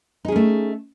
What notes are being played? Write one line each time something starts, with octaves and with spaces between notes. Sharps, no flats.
A3 C#4 D#4 G#4